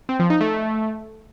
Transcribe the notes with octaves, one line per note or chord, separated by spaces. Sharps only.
C4
F3
D#4
A3